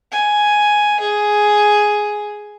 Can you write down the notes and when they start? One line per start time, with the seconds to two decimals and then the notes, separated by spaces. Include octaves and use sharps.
0.12 G#5
1.00 G#4